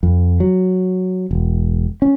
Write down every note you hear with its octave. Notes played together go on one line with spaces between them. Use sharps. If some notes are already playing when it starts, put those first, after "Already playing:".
F2
F#3
E1
C#4